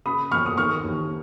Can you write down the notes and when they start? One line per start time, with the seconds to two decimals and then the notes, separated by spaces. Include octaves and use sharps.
0.06 C#3 B5 D#6
0.31 F2 C#6 F6
0.46 D#6
0.57 D#3 C#6 F6
0.83 D#2